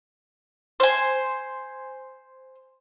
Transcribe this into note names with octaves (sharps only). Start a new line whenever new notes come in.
C5 G#5